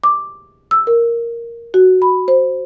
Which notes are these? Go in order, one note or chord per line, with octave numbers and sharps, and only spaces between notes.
D6
E6
A#4
F#4
B5
C5